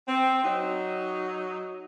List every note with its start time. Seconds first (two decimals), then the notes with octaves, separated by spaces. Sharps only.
0.08 C4
0.44 F#3 D#4